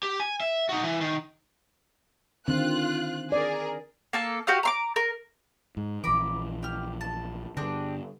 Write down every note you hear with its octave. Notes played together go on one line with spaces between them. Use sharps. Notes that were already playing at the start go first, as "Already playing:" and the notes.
G4
G#5
E5
D#4 F#4
E3
D#3
D3 D#3 C4 F4 F#6
G#4 A#4 D5
A#3 A4 A5
F#4 G4 F5 D#6
A#5 C6 D6
A#4
G#2
A#1 E3 A#5 B5 D6
G4 F6
A5
G2 D3 C4 D4 G#4